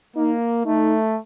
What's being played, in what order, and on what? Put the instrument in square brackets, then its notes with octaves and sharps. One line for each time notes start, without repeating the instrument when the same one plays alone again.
[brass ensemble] A#3 [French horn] D#4
[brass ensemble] A3 [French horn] D#4